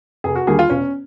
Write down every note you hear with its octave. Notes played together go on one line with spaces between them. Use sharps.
F1 G#4
F#4
D#2 D3 G3 A#3 G#4
F4
E1 C#4